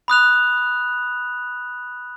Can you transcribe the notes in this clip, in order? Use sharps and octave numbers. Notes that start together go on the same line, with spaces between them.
B5 D#6 F#6 F7